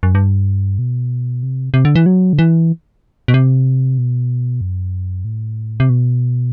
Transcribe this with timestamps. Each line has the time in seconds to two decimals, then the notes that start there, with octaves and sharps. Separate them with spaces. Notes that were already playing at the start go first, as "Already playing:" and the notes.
0.03 F#2
0.15 G2
0.79 B2
1.43 C3
1.74 C3
1.85 D3
1.96 E3
2.06 F#3
2.33 D3
2.39 E3
3.28 B2
3.34 C3
3.98 B2
4.61 F#2
5.25 A2
5.80 C3
5.89 B2